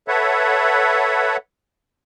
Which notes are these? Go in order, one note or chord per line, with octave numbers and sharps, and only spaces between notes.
A4 B4 C#5 E5 F#5